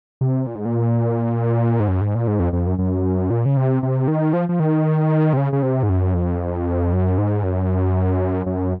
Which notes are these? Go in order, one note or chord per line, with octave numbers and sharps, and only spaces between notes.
C3
A#2
G#2
A#2
G#2
F#2
G#2
A#2
G#2
F2
F2
F#2
F#2
A#2
C#3
C3
C3
D#3
F3
F3
D#3
C3
C#3
C#3
C3
G#2
F#2
F2
F#2
G#2
F#2
F#2